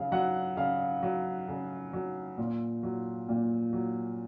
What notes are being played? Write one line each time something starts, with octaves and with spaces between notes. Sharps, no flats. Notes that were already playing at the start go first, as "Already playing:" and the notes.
Already playing: C#3 F#3 F5
F#3 F#5
C#3 F5
F#3
C#3
F#3
A#2
F#3
A#2
F#3